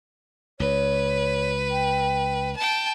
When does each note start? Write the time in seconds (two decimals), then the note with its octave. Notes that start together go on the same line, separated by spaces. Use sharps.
0.60 C#2 B4 C#5
1.71 G5
2.57 G5 A5